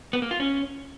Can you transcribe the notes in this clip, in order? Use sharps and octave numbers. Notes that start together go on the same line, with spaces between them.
B3
A#3
F4
C#4